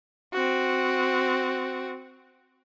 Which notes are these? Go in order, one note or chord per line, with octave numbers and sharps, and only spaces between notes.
C4 F#4